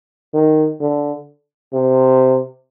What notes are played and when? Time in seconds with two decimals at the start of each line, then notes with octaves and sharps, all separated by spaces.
0.34 D#3
0.81 D3
1.73 C3